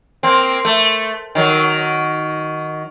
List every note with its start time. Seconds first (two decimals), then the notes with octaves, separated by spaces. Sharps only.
0.23 A#3 C4
0.65 A3
1.35 D#3 F#3